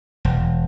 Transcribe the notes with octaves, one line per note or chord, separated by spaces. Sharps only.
E1